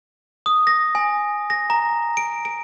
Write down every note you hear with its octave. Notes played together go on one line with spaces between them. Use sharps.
D#6
A#6
G#5
A#6
A#5
D7
D7